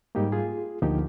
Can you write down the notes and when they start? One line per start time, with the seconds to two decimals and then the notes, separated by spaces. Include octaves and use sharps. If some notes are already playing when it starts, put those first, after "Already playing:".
0.15 G#2 G3 A#3 D#4 G4
0.32 F4 G#4
0.82 D2 D3 F3 A#3 D#4 G4